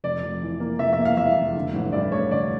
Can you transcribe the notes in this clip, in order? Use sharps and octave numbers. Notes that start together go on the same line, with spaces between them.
F1 D5
F1
E3
A#3
F1 E5
E5
A#3
F5
E2 E5
F1
D3
A1
G2 D5
A3 C#5
D3 D5